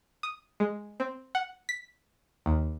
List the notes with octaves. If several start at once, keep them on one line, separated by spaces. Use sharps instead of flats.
D#6
G#3
C4
F#5
B6
D#2